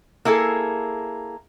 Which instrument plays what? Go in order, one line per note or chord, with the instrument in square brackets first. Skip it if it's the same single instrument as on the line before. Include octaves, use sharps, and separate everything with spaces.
[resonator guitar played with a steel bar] A#3 E4 G#4 A4